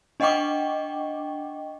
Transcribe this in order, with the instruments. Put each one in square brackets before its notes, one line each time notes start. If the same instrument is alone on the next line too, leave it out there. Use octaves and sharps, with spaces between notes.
[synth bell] D4 D#5 F#5 G5 C#6 D6